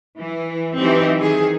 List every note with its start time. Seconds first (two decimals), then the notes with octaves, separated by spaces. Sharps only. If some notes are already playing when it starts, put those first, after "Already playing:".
0.19 E3
0.78 E3 F#3 C4 D#4 G4
1.20 D#3 G#4